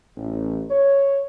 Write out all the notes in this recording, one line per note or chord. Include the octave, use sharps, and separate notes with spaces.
A1
C#5